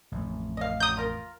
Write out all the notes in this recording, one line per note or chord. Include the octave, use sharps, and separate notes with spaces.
A1 F2
D#5 F5
F#3 D#6 G6
F4 A#4